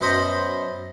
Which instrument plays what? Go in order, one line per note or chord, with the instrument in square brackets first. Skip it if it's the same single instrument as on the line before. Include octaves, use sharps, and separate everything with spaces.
[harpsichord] F#2 B2 C5 D#5 B5